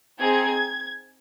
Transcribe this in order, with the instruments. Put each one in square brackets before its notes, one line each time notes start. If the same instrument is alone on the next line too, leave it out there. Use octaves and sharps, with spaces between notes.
[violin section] C4 D#4 G#4 G#6